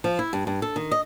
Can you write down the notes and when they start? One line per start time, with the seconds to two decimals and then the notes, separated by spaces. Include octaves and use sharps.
0.04 F3
0.19 E4
0.33 G2
0.47 G2
0.62 A4
0.76 D#3
0.91 D#5